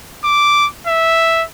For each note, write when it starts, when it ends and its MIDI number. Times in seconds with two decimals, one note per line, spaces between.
0.25 0.68 86
0.87 1.44 76